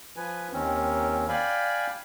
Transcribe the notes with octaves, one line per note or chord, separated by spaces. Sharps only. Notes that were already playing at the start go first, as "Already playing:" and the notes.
F3 B4 G#5
D#2 D#3 C4 C#4
D5 F5 G5 G#5 B5